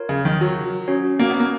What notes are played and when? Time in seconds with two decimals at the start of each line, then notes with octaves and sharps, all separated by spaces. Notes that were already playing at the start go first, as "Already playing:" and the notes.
Already playing: F4 A#4 C#5
0.09 C#3
0.25 D#3
0.41 F#3
0.88 C#4 F#4 C#5 F#5
1.19 A#3
1.30 B3
1.40 A#3